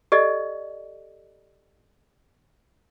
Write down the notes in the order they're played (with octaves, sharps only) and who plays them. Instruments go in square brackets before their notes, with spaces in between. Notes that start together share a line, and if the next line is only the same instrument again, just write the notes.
[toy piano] G4 A4 D5 D#5